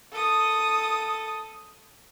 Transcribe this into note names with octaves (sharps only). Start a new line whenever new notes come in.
A4 D#6